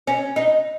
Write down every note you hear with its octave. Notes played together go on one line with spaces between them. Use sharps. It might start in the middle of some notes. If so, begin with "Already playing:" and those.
C#4
D#4